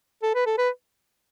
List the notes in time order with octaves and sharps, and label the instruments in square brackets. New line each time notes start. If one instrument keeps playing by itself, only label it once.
[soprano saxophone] A4
B4
A4
B4